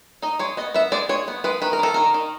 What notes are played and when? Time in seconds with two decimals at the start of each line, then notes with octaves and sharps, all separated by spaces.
0.22 D#4 D#5
0.39 G#3 C#5
0.57 B3 D#5
0.74 B3 E5
0.92 G#3 D5
1.09 G#3 C#5
1.28 B3
1.44 G#3 B4
1.62 D#3 B4
1.73 A#4
1.79 D#3 A4
1.94 D#3 A#4
2.14 D#3